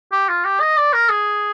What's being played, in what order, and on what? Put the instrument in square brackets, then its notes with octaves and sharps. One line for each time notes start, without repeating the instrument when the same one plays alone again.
[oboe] G4
F4
G4
D#5
D5
A#4
G#4